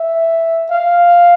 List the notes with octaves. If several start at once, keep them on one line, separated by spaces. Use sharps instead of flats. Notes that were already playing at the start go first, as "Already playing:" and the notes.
Already playing: E5
F5